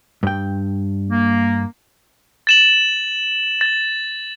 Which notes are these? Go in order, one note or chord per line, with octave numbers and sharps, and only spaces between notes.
G2 G5
A#3
A6 E7 F#7
A6